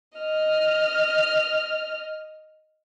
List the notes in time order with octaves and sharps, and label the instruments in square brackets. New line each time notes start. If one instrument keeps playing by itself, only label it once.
[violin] D#5 F6